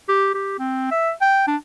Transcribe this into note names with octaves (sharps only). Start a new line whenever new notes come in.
G4
G4
C4
E5
G5
D4